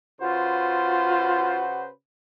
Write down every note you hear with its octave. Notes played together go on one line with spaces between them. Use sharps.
C#3 F4 F#4 B4 C5